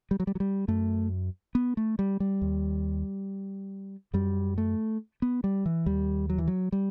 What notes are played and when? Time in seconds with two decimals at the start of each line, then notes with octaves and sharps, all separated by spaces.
0.11 G3
0.20 F#3
0.27 G3
0.35 F#3
0.40 G3
0.68 F#2 A3
1.55 B3
1.77 A3
1.99 G3
2.20 G3
2.42 D#2
4.14 F#2 G3
4.58 A3
5.22 B3
5.44 G3
5.66 E3
5.86 D#2 G3
6.30 F#3
6.38 E3
6.48 F#3
6.72 G3